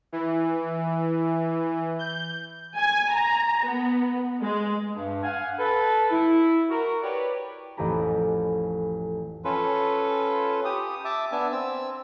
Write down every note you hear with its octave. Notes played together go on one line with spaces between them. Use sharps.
E3
G6
G#5
A#5
B3
G#3
G2
F5 F#5 G#5
A4 B4
E4
F#4 A#4
G4 B4 C#5 D5
A1 F2 G4 G#5 A#5 B5
C#4 F4 A4 B4
G4 D#6
E5 A5 D6
B3 D4 E5 G#5
C4 E6